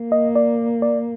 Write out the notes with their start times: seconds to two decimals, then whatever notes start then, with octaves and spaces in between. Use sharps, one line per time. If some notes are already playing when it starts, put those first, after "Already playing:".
Already playing: A#3
0.12 D#5
0.35 D5
0.82 D5